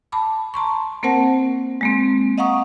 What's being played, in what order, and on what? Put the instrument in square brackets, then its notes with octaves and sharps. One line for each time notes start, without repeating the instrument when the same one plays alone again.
[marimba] A5 B5 D6
A5 A#5 C6 C#6
A#3 C4 A#4 C5 F#5 A5
G#3 A#3 C4
D#5 F5 F#5 A#5 C#6 D#6